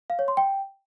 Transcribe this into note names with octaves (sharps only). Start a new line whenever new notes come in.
F5
C#5
C6
G5